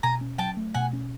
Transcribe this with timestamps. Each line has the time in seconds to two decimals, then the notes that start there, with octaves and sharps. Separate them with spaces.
0.03 B2 G#5 A#5
0.21 C#4
0.38 F#3 G5 A5
0.57 A3
0.74 B2 F#5 G#5
0.93 C#4